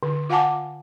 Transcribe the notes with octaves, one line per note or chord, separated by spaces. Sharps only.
D3
F4 F5 F#5 G#5 A5 D6